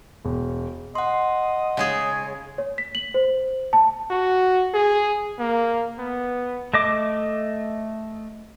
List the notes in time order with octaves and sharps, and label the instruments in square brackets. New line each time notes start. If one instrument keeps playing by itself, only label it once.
[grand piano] E1
[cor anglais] D#5 [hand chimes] F#5 C6
[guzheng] C#3 G#3 G#4 [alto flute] C#5
[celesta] C#5
B6
F#7
C5
A5
[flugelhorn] F#4
G#4
A#3
B3
[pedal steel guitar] A3 D#5 D6